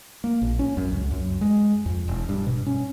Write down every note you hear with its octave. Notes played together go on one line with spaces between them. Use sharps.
A#3
A#1
C#4
F#2
C#2
F#2
G#3
F2
E1
G2
B2
C#4